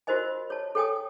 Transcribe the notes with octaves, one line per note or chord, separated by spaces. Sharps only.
F4 F#4 A#4 C5 D#5 G#5
C#5 A5
A4 C#5 G5 G#5 D#6